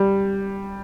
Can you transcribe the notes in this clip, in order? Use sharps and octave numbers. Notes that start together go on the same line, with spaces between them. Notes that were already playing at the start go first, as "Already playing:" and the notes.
Already playing: G3